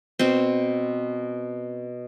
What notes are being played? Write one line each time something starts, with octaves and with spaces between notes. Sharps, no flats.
B2 C4